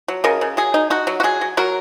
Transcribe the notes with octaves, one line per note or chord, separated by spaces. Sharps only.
F#3
C#3 A#4 D#5
C#3
F#3 G#4
D#4
D#4 F#4
F#3
F#4
F#3 G#4
F#3
F#3 F#4 A#4